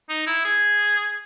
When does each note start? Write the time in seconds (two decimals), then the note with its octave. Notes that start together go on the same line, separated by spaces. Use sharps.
0.09 D#4
0.27 E4
0.45 G#4